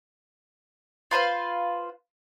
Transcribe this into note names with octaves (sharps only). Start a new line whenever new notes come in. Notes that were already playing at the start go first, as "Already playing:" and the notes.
F4 B4 C5 F5